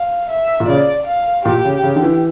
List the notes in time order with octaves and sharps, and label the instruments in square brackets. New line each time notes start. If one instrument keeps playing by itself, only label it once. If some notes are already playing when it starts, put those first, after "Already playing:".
Already playing: [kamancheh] F5
E5
[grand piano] A#2
[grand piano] C#3 [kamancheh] D5
[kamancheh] F5
[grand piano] A#2 [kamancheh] G4
[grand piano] C#3
C#3
D3
E3